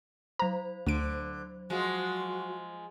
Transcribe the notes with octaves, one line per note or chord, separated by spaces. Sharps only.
F#3 C5 A#5
D2 D3 D7
F3 G#3 F#4